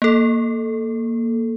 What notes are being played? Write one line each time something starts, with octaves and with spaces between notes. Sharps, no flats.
A#3 A4